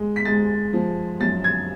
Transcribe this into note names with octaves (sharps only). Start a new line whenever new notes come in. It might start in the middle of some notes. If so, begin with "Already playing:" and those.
Already playing: G#3
B6
G#3 A6
F3
F#2 A6
G#6